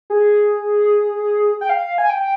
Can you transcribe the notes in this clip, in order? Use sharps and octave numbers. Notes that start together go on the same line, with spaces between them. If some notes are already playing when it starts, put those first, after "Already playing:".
G#4
G5
F5
G#5
G5